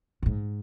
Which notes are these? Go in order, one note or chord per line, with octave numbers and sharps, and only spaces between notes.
A#2
G#2